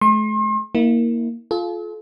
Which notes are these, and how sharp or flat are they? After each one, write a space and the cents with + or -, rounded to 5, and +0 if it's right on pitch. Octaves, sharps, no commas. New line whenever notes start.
A3 -45 C6 +40
A#3 +0 E4 -35
F4 +0 A4 -45